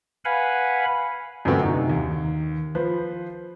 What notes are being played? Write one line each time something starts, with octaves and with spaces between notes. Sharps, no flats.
B4 F5 F#5 G#5 B5
F#2 D3 A3 B3 C4 F#4
C3 D#4
D#2
F3 B4 C5